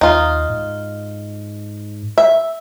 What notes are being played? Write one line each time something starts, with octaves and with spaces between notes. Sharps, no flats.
D#2 D#4 F4
G#2
E5